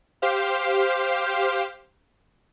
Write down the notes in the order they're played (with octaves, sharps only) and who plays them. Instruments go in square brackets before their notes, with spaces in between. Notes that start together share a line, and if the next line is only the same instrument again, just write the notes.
[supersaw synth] G4 C5 F5